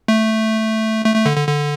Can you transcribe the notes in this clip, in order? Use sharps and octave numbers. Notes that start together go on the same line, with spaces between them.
A3
A3
A3
D3
D3
D3